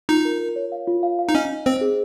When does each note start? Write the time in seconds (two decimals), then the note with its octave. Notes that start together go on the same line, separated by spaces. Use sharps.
0.09 D#4 F4
0.25 A#4
0.40 A#4
0.56 C#5
0.72 F5
0.87 F4
1.03 F5
1.19 F5
1.29 D#4
1.35 C#4 D#5
1.50 D#4
1.66 C4 C5
1.81 G#4